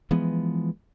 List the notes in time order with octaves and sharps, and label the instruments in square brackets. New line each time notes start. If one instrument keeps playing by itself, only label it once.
[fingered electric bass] E3 F3 G#3 B3